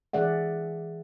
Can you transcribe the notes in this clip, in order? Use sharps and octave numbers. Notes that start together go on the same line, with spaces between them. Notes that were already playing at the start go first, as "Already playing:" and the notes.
E3 G#4 D5 E5 F#5